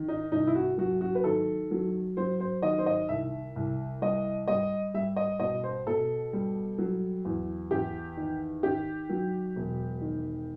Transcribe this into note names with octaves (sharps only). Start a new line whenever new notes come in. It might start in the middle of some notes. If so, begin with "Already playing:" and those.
Already playing: D#3
D#4
C2 D#4
E4
F#4
F#3 F#4
F#4
B4
D#3 A4
F#3
F#3 C5
C5
D#3 D#5
C5
D#5
C2 E5
C2
G3 D#5
G3 D#5
G3 E5
D#5
B2 D#5
C5
B2 A4
G3
F#3
E2
E2 G4
D#3
D#3 G4
F#3
E1
D#3